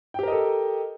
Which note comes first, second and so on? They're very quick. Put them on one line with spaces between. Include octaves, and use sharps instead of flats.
G5 G4 A#4 D#5 A4